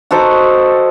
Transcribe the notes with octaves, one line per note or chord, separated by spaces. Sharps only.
F#4 A4 C5 D#5